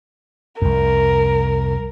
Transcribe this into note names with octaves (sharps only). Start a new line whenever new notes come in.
C2 F2 A#4